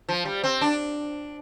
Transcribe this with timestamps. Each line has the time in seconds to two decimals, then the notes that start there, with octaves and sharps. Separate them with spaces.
0.09 F3
0.25 G3
0.44 C4
0.61 D4